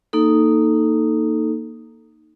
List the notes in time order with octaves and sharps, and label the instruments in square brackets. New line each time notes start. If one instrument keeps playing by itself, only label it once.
[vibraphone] A#3 D#4 A4